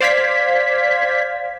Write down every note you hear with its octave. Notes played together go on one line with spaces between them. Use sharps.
C5 D5 F5 G#6 B6